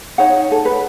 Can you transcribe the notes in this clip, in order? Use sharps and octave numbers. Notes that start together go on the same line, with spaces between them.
D#4 C#5 F#5
A4
B4